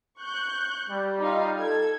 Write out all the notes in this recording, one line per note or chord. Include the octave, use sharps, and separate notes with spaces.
C#6 F#6 G6
G3
D#4 F4 F5
A4 G#6